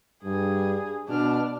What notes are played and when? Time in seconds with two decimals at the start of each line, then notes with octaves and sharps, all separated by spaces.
0.24 G2 G#4
1.09 B2 D4 F6